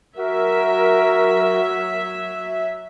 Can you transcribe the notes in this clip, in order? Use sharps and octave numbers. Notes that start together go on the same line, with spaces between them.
F#3 F#4 A#4 E5